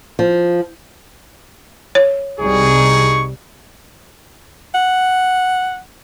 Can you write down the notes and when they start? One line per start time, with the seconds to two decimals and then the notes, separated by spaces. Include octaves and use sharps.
0.19 F3
1.95 C#5
2.40 C2 G3 D#4 G#4 C#6
4.74 F#5